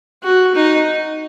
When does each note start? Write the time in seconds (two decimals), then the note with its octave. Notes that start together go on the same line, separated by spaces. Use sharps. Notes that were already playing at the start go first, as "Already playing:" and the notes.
0.23 F#4
0.54 D#4